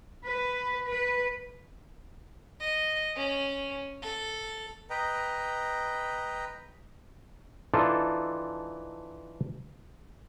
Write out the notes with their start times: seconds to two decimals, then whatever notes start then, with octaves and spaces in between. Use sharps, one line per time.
0.25 B4
0.87 B4
2.61 D#5
3.16 C#4
4.02 A4
4.90 B4 D#5 G5 A#5
7.74 E3 D4 D#4 F4 A4 C5